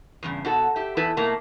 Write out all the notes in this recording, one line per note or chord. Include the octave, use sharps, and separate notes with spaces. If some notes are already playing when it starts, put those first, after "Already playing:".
E2 G2 C#3
B2 F#4 A4
G4 E5
E2 E4 A4 B4
B2 A3 A#3